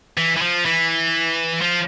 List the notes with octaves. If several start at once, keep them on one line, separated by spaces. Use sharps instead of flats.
E3
E3
F3
E3
F3